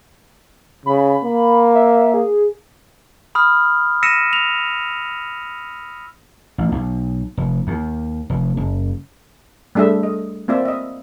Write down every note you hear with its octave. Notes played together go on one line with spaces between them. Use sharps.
C#3 B5
A#3
E5
G#4
B5 D#6 F6
E6 A#6 B6 C#7 D#7 E7
F7
A1
B1
F1
D#2
F1
F#1
G3 A3 D4 G#4 E5
D#5
A#3 C4 F4 D5 E5
D#5 E5